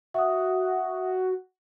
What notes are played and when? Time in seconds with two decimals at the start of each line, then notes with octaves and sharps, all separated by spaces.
0.14 F#4 E5 F#5 D#6